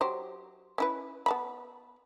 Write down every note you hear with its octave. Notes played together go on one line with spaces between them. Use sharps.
F#3 G4 C5
C#4 E4 B4
B3 A5 B5